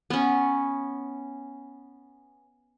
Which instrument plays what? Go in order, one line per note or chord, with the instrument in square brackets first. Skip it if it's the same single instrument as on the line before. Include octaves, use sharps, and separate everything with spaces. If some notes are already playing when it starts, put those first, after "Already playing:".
[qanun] B3 C#4